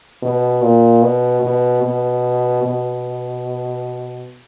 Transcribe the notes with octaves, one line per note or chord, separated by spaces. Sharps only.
B2
A#2
B2
B2
B2
B2